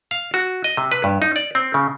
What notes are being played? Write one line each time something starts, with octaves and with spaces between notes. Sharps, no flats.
F5
F#4
D#5
C3
B4
G2
D#4
D5
C4
C#3